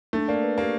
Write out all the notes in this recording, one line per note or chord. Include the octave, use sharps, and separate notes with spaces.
A3 D4
A#3 D5
B4
A#3 G4